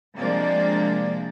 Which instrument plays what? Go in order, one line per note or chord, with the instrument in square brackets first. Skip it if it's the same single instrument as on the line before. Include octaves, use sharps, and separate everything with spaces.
[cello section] C3 F3 G#3 A#3 D4 D5